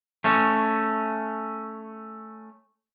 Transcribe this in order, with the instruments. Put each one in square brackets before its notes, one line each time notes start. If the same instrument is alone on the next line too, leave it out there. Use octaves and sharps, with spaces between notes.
[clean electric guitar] A3 C#4